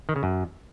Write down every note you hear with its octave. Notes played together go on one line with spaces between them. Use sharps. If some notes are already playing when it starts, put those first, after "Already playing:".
D#3
C#3
F#2